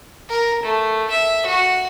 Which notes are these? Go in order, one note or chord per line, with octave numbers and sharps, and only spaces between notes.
A#4
A3
E5
F#4